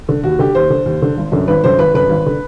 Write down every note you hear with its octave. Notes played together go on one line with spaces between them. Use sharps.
D3
D#2 F#4
D3 G4
D#2 C5
D3
D#2
D3
G#1
F#2 D3
G#1 B4
F#2 D3 C5
G#1 B4
F#2 D3 B4
G#1
D3